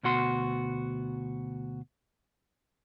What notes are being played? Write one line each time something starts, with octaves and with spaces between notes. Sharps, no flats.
D2 B2 F#4 C6